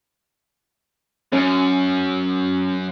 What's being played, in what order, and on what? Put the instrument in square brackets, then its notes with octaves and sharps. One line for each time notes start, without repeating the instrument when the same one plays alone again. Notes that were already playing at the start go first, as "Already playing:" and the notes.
[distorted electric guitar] F#2 [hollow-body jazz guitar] C#4